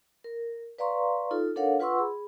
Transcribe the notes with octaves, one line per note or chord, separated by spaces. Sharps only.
A#4
B4 D5 F5 A#5 C6 C#6
D#4 F4 A4
D4 A4 A#4 C#5 F5 F#5
F4 B4 F#5 C6 C#6 E6
G#4 B5